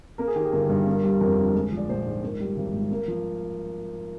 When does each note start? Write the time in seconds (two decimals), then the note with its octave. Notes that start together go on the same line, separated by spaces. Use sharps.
0.18 A#3 A#4
0.27 G#4
0.36 D#3 G4
0.44 G#4
0.52 G1 A#4
0.69 G2
0.87 A#3
1.04 G3
1.20 F2 A#4
1.38 D3
1.55 G#3
1.72 F3
1.77 D5
1.89 A#1 C5
2.06 G#2
2.23 A#3
2.40 G3
2.56 G#1
2.74 G#2
2.91 A#3
3.08 F3